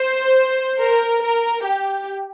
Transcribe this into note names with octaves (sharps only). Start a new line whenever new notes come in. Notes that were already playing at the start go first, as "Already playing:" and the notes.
Already playing: C5
A#4
A#4
G4